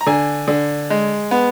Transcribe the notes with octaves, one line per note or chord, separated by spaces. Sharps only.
A#5
D3 G#5
D3
G#3
B3